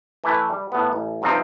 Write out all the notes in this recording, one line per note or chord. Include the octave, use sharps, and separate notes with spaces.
E3 A3 E4 B4
G3
A2 B3
A1
G2 C3 F3 C4 D#4